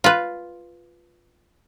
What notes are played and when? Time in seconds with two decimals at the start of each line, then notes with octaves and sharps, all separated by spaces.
0.04 F4 B4